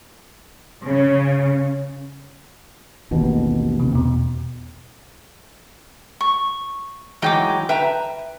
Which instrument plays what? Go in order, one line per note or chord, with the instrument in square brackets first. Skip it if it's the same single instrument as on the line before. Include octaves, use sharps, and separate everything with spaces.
[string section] C#3
[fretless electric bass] A1 D#2 B2
[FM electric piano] C3
E2 B2
[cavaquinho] C#6
[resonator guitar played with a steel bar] E3 F#3 G#3 [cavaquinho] D#4 G5 D6
[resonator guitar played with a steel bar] B4 G5 A#5 [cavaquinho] E5